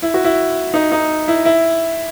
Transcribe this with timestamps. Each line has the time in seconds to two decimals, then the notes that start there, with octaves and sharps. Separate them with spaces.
0.02 E4
0.14 F#4
0.24 E4
0.74 D#4
0.92 D#4
1.28 E4
1.45 E4